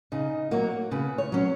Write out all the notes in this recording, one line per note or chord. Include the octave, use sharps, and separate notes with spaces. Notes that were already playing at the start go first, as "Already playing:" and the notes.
C#3 D#4
F#3 A#3 F#4
C#3 B4
C#5
F#3 C#4